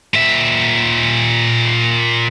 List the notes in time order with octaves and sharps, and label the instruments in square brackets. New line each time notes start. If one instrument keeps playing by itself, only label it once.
[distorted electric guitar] A#2 E5